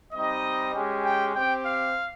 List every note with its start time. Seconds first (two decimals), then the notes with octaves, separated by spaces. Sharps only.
0.13 G3 C4 D#4 D#5
0.74 G#3 C#4 G4
1.04 G5
1.34 C4 G4 G5
1.64 F5